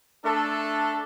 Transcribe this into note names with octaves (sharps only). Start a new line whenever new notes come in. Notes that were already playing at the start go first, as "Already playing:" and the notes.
A3 D4 A4